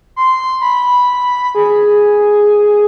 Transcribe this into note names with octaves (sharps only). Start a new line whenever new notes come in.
C6
B5
G#4